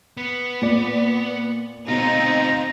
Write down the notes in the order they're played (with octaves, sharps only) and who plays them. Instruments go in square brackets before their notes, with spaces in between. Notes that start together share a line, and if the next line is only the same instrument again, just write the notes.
[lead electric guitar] B3
[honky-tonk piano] A#2 D5
[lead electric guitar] D2 F4 [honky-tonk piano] B2 [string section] C4 D#4 [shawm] A#5